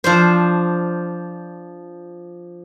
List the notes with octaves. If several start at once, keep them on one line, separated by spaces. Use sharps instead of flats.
F3 D4 C5